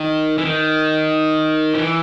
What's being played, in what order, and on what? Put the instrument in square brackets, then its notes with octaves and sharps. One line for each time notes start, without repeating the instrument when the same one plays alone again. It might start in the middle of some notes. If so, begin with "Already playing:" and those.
Already playing: [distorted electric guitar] D#3
E3
D#3
F3
E3